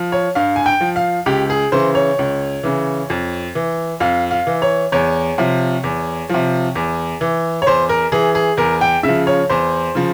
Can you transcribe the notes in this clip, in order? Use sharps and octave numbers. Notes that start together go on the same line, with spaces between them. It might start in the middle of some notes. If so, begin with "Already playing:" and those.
Already playing: F3
C#5
G2 F5
G#5
G5
F3
F5
C#2 G4
G#4
C#3 E3 C5
C#5
C#2
C#3 E3
F2
E3
F2 F5
F5
E3
C#5
E2 C#5
C3 F3
E2
C3 F3
E2
E3
C#5
E2 C5
A#4
E3 G#4
G#4
E2 A#4
G5
C#3 E5
F3
C#5
E2 C5
C#3 F3